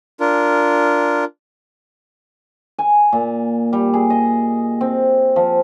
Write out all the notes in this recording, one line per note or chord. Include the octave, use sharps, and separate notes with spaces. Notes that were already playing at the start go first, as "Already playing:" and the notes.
D4 F4 A#4
G#5
A#2
G3
G#4
D#5
C4
F3